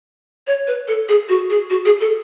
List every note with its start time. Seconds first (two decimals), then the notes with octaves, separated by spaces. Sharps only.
0.47 C#5
0.67 B4
0.88 A4
1.09 G#4
1.29 F#4
1.50 G#4
1.70 F#4
1.85 G#4
2.01 A4